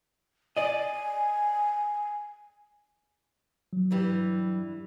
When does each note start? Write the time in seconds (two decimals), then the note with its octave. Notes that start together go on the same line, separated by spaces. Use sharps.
0.57 D5 D#5 G#5
3.73 F#3
3.91 G2 E3 G3